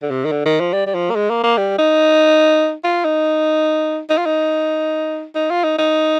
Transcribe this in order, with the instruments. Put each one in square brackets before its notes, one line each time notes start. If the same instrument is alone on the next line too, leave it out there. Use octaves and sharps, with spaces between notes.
[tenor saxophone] D3
C3
D#3
D3
D#3
F3
G3
G3
F3
A#3
G#3
A#3
A#3
G3
D#4
F4
D#4
D#4
F4
D#4
D#4
F4
D#4
D#4